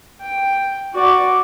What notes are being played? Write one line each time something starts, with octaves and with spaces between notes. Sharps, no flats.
G5
F#4 D5